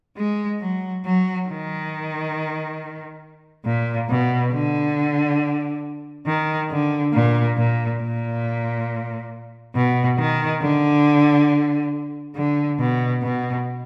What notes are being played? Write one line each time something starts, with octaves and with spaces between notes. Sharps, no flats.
G#3
F#3
F#3
D#3
A#2
B2
D3
D#3
D3
A#2
A#2
A#2
B2
D#3
D3
D3
B2
B2